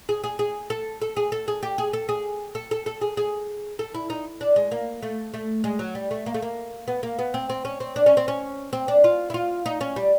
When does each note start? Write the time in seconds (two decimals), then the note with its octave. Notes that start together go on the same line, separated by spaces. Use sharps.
0.09 G#4
0.24 G#4
0.39 G#4
0.70 A4
1.02 A4
1.17 G#4
1.32 A4
1.48 G#4
1.63 G4
1.78 G#4
1.93 A4
2.09 G#4
2.55 A4
2.71 A4
2.86 A4
3.01 G#4
3.17 G#4
3.79 A4
3.94 E4
4.10 D#4
4.41 D4
4.56 G#3
4.71 A#3
5.03 A3
5.34 A3
5.64 G#3
5.79 F#3
5.95 G3
6.11 A3
6.26 A#3
6.34 A3
6.42 A#3
6.88 B3
7.03 A#3
7.19 B3
7.34 C4
7.50 C4
7.65 C#4
7.80 C4
7.96 D4
8.06 C#4
8.17 C4
8.28 C#4
8.73 C4
8.88 D4
9.04 F4
9.30 E4
9.34 F4
9.66 D#4
9.81 C#4
9.96 G3